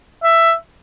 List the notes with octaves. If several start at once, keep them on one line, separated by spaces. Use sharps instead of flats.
E5